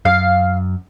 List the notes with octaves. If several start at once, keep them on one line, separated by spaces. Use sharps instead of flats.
F#2 F5